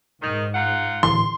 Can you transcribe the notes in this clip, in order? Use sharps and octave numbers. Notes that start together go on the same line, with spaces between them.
G#2 D#3
D#4 F4 F#5
D1 G#1 E3 C6